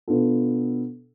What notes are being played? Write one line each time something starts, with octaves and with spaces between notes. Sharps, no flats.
B2 B3 D4 F4 A4